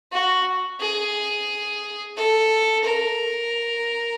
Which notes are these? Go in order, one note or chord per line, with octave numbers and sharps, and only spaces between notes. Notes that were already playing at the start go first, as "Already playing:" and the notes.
F#4
G#4
A4
A#4